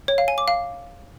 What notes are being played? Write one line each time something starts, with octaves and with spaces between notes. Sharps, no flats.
C#5
F5
G#5
D6
F5